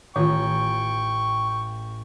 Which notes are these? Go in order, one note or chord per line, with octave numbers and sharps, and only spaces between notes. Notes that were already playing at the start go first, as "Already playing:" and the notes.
A1 D#3 F4 G5 A#5 C#6 G6